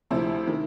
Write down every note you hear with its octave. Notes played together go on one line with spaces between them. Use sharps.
D2 C3 F3 E4
D#3